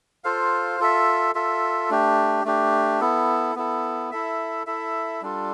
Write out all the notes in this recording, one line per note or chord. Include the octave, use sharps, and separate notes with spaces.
F4 A4 C5 F5
F4 A4 E5
F4 A4 E5
A3 D4 G4
A3 D4 G4
B3 E4 A4
B3 E4 A4
E4 A4 E5
E4 A4 E5
G3 D4 F4 A4